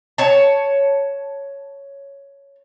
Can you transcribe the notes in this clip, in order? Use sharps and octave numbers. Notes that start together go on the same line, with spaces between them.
C#5 A5